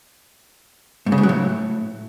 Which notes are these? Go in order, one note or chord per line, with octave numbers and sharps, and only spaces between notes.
G#2
C#3
G#2
F#3
A2